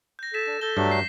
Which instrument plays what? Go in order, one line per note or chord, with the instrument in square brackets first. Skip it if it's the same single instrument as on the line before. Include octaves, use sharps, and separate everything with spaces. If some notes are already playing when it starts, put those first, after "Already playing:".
[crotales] G6 A#6
[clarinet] A4 [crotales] B6 E7
[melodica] D4
[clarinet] A4 [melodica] A5 [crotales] G6 A#6 G7
[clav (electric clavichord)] G2 [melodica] F#3 A3 D4
[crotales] C7